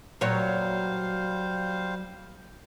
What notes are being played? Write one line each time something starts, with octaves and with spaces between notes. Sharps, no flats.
A#2 F#3 G3 C5 C#5 F5